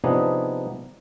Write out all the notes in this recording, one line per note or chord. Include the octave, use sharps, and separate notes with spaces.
C3 F3 B3 D4 D#4 G#4